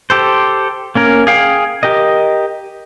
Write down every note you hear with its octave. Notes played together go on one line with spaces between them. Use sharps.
G4 A4 C5
A#3 C#4 A#4
G#4 F5 G5
G4 A#4 D#5